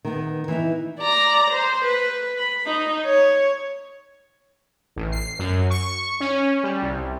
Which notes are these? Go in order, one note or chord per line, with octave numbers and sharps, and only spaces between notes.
D#3 B3
E3 B3 D#4
D5 A#5
C5
B4
B5
D#4
C#5
A1
C7
F#2
C#6
C#4
G3
C2